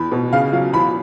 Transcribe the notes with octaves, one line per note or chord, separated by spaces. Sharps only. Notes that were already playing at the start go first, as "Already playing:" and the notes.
Already playing: E2 B5
B2
C#3 F5
F#3 F5
E2 B5